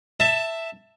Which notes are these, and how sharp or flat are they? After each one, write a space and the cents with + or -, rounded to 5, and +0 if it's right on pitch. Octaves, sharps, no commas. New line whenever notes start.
E5 +0 A5 +15